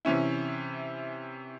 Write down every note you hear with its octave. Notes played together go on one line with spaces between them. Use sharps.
C3 E3 C#4 E4